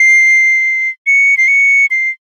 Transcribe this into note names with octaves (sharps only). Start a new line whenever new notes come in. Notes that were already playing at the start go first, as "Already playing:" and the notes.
Already playing: C7
C#7
C7
C#7
C7